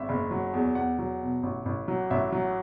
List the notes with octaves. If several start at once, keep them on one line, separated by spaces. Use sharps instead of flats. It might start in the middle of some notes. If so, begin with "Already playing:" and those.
Already playing: G#1 E5
F#1
F#3
E2
E2 F#5
F#3
B2
A1
A1
F#3
A1 E5
F#3